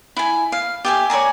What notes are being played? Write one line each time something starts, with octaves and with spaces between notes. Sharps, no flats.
E4 G#5
F5
G4 E5 G#5
C#5 D5 G#5 A#5